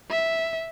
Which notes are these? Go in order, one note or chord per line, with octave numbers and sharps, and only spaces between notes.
E5